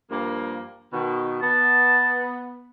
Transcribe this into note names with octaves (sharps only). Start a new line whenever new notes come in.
G2 F3 A#3
B2 D#3
B3 A5